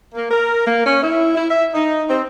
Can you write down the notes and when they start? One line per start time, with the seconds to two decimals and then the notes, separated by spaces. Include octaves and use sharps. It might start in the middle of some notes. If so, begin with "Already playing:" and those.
0.14 A#3
0.31 A#4
0.65 A#3
0.86 C#4
1.03 E4
1.36 E4
1.50 E5
1.74 D#4
2.09 C4